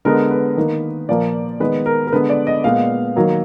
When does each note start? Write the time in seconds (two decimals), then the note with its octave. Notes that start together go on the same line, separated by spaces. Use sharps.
0.05 D3 G#3 B3 A#4
0.31 B4
0.57 D#3 A#3
1.09 A#2 F3 A#3 D5
1.60 D#3 G#3 B3 B4
1.86 A#4
2.07 A#4
2.13 D3 G#3 B3 B4
2.29 D5
2.47 D#5
2.64 A#2 G#3 B3 F5
3.16 D#3 F#3 A#3